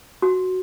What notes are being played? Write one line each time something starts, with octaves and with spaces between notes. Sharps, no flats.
F#4